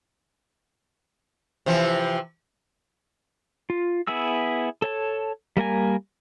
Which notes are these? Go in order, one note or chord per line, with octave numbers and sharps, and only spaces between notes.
C3 E3 F3
F4
B3 E4 G#4 E6
A4 C#5 A5
G3 A#3 A#4 G#5